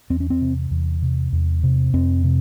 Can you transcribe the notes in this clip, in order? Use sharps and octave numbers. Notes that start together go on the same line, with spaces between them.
E2 C4
C#4
C4
C3
E2
C3
E2
C3
F2 C4
C3